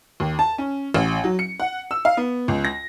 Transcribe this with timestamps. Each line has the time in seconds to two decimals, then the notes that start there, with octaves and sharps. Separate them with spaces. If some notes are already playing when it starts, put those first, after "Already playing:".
0.20 D#2
0.39 A5
0.58 C#4
0.94 A1
1.24 F#3
1.39 C#7
1.60 F#5
1.91 E6
2.05 F5
2.17 B3
2.48 C#2
2.65 A#6